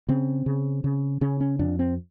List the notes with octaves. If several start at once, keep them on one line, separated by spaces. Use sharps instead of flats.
C#3 C4
C#3
C#3
C#3 C#4
C#4
F2 D4
C4